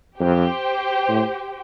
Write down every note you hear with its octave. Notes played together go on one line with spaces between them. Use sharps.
F2 G4 C5 G5
A2